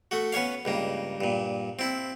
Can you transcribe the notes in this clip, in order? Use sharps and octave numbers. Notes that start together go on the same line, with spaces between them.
A3 F#4
B3 C#4 C#5 F5
C#2 G2 A#3
G2 A#2
C4 E4